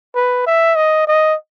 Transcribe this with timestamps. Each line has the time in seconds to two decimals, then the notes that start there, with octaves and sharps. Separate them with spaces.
0.15 B4
0.46 E5
0.76 D#5
1.07 D#5